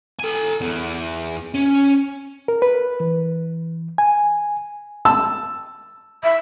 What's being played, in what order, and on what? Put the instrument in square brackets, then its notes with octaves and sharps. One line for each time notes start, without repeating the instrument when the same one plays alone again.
[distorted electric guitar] A4 G#5
E2
C#4
[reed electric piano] A#4
B4
E3
G#5
[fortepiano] A5 E6
[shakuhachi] E5